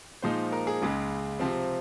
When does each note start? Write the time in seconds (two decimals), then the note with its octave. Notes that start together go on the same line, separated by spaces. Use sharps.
0.22 A#2 F3 G#3 D#4 C5
0.52 A#4
0.67 G#4
0.82 C#2 C#3 G#3
1.39 C3 F3 C4